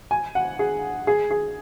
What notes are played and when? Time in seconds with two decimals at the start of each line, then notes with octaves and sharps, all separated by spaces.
0.11 G#5
0.35 F#5
0.59 G#4
1.07 G#4
1.31 G#4